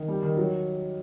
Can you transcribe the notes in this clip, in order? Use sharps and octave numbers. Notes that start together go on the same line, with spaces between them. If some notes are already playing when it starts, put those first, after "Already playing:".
Already playing: D#3
G3
D#3
F#3